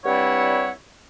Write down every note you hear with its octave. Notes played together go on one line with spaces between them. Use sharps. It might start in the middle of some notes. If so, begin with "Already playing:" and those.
G2 G3 C4 E4 C#5 F#5